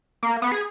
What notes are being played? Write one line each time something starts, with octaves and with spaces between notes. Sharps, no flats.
A#3
B3
G#4